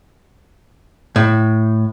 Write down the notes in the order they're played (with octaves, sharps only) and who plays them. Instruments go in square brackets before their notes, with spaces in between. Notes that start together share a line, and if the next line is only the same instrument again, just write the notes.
[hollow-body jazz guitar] A2